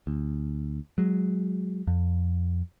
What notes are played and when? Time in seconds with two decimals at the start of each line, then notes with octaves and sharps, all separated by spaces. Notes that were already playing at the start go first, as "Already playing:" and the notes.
0.07 D2
0.98 F#3 G#3
1.87 F2